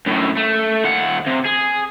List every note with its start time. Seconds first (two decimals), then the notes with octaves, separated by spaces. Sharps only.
0.07 F#2 A2
0.37 A3
0.84 D#2 F#5
1.27 C3
1.46 G#4